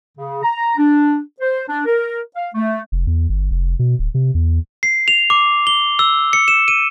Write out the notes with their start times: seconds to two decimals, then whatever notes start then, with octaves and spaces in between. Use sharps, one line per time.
0.17 C#3
0.43 A#5
0.77 D4
1.40 C5
1.68 D4
1.85 A#4
2.36 F5
2.54 A3
2.92 F1
3.07 E2
3.29 G1
3.51 F1
3.79 B2
3.99 D1
4.14 C3
4.35 E2
4.83 C7
5.08 F7
5.30 D6
5.67 G7
5.99 E6
6.33 C#7
6.48 E7
6.68 D#7